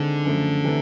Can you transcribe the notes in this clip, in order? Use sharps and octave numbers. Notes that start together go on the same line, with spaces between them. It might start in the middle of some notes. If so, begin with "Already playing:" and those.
Already playing: D3 D#3 G#3 C4
F#2 C#3 F3 A3
C3 E3 A3